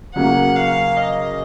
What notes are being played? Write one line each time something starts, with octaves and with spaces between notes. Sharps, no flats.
C#3 F#3 A#3 F#5
F5
D#5